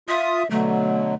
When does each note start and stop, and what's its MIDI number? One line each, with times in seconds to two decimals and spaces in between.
0.09 0.43 65
0.09 0.49 76
0.09 0.43 87
0.50 1.15 47
0.50 1.15 50
0.50 1.15 54
0.50 1.15 57